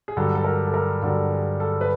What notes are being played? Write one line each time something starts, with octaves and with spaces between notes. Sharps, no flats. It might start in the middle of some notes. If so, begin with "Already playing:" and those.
G#4
G2 D3 F#3 A4
A4
A#4
A4
A#4
G2 D3 F#3 A4
G#4
A4
B4